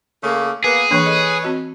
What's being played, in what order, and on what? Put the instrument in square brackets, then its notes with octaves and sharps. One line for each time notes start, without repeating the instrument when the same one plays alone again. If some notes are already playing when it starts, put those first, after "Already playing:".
[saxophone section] C#3 A3 A#3
[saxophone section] A#3 B3 [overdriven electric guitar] G#4
[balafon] E3 A#3 D4 [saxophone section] B4 C#5
[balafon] A4 D#5
C4 F#4 D#5